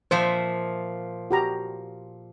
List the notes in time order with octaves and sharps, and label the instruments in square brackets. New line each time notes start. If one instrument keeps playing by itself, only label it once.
[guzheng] A#2 F3 E5 [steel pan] C5
[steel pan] F#4 G4 A#5